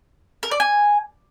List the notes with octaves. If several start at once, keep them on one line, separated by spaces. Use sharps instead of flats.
A#4
D5
G#5